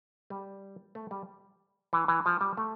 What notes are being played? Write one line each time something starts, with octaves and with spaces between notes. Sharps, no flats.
G3
A3
G3
E3
E3
F3
G3
A3